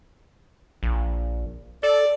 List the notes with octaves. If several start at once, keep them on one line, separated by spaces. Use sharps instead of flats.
A#1
A4 D5